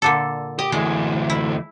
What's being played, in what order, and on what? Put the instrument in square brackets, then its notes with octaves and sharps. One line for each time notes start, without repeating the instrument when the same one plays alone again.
[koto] A#2 D3 A4
[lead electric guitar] G4 [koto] D#5
[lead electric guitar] D2 E3 [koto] G#3
[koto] E4